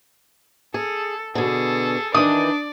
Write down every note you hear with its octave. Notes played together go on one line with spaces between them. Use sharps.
G#4 A4
B2 D3 G#4 A4
D#3 E3 D4 D5 D#6